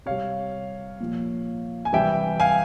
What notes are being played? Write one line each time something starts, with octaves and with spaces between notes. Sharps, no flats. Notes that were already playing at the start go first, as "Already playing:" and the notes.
C3 G3 C#5 F5
A#2 F3
G#5
C3 E3 G3 E5 G5
F5 G#5